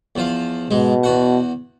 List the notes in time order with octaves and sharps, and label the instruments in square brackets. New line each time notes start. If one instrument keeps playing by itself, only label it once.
[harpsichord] E2 F3 F5
[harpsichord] G#2 G#3 [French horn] B2
[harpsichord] E2 F#4 F#5